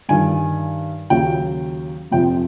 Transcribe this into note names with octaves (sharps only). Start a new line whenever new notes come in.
G2 D#3 G3 G#5
D#2 C#3 F#3 G5
F2 C3 F3 G5